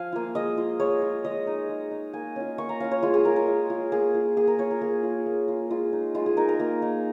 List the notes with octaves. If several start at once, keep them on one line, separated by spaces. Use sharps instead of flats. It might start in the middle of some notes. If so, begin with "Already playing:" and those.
Already playing: F3 F5 G#5
A#3 F4
G#3 D#5
F4
G#3 C#5
F4
G#3 D#5
D#4
G#3
D#4
A#3 G#5
C#4 F4
A#3 C#6
A#5
C#4 F4 F5
C#5
G#3 F4
G#4
F4 A#4
A#4
G#3
F4
A#3 G#4
F4
A#3 G#4
A#4
F4 C#5
A#4
A#3 G#4
F4
A#3
F4
G#3 F4
D#4
G#3 F4
G#4
D#4 A#4
A#4
A#3
D#4